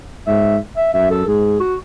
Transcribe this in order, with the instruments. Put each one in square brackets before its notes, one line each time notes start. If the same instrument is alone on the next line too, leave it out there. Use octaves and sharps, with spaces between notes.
[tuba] G#2 [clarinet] E5
[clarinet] E5
[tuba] F#2 [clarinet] E5
[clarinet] A4
[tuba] G#2 [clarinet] G#4
[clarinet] F#4